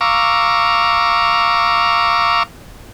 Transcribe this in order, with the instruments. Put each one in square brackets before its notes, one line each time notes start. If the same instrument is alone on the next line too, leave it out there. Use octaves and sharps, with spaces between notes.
[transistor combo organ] F5 A#5 C#6 D6 E6